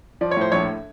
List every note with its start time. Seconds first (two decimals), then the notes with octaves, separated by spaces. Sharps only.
0.21 F3 D5
0.31 C#5
0.37 A2 C5
0.52 A#1 C#5